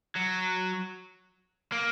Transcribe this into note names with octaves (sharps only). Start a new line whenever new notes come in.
F#3
A#3